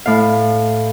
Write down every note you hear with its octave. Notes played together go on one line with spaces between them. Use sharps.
A2 F5